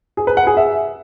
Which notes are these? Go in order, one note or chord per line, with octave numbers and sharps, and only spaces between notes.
G#4
B4
F#5
G#4
E5